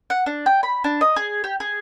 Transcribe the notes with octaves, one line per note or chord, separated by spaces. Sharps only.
F#5
D4
G5
B5
D4
D#5
G#4
G4
G#4